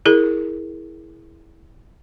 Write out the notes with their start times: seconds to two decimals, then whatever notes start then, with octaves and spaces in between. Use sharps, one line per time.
0.05 E4 G#4 A#4